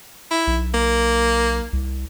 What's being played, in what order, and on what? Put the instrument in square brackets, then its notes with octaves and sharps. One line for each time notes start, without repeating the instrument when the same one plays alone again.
[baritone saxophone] E4
[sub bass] B1
[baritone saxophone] A#3
[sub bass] C2